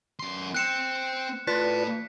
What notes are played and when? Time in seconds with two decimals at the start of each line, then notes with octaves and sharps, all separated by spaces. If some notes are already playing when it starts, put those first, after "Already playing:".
0.19 F#2 C6
0.54 C4 F#6 C#7 E7
1.47 A2 F4 B4 D5 A5 B6